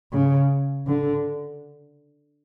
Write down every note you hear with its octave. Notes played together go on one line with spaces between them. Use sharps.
C#3
D3